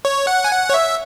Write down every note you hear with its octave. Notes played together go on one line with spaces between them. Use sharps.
C#5
F#5
G#5
F#5
C#5
E5